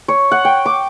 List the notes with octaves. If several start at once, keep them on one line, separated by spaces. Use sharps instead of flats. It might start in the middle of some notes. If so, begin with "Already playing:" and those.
C#5
F#5
G5
D6